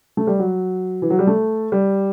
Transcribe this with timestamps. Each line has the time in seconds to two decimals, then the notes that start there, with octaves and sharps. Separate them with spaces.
0.17 A3
0.27 G3
0.39 F#3
1.02 E3
1.10 F#3
1.19 G3
1.27 A3
1.72 G3